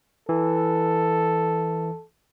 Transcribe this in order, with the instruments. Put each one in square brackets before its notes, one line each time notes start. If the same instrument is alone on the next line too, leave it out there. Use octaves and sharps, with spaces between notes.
[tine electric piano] E3 [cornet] A4